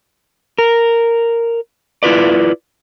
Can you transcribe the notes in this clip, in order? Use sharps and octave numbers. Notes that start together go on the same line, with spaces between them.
A#4
E4 F4 B4 D5